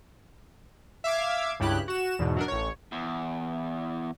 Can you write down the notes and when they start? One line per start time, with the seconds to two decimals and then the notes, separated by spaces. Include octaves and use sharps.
1.04 E5 F5 D6 G#6
1.59 C#2 G2 C#3 E4 G4 F#6
1.88 F#4 E7
2.19 E2 G#2 B2
2.36 F#3 D4 A#4
2.48 A1 C#5
2.92 E2